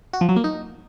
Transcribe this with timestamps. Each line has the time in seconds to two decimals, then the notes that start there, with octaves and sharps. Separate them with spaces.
0.13 F#4
0.21 F3
0.29 F#3
0.36 A#3
0.44 D#4